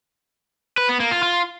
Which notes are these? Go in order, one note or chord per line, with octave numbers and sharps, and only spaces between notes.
B4
B3
A#3
F4
F4